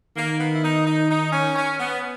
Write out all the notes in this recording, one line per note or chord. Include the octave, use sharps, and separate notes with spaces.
D#3 A#3
B3
E4
D#4
D#4
D#4
C#4
C#4
B3